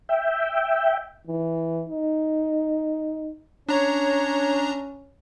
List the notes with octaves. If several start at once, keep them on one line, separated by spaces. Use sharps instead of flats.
E5 G5
E3
D#4
C#4 D4 C#5 A#5